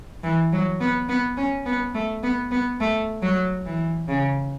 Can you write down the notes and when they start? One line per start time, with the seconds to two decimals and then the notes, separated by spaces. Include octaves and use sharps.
0.24 E3
0.52 F#3
0.81 B3
1.09 B3
1.37 C#4
1.66 B3
1.94 A3
2.23 B3
2.51 B3
2.80 A3
3.22 F#3
3.66 E3
4.08 C#3